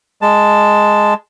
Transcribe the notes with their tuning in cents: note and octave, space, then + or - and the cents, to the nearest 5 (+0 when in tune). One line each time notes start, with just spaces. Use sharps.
G#3 +0 A5 +0